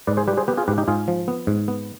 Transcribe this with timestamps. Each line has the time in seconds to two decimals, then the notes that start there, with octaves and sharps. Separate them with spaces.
0.07 G#2 B4 D5
0.17 G#4 C5
0.28 G3 G4 B4
0.37 G#4 C5
0.48 B3 G4 B4
0.57 F4 G#4
0.68 G#2 G4 B4
0.78 D#4 G4
0.88 G#2 F4 G#4
1.08 F3
1.28 B3
1.47 G#2
1.68 B3